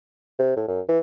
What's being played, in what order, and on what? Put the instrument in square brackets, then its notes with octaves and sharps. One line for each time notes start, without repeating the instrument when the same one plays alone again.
[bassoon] C3
A2
F#2
E3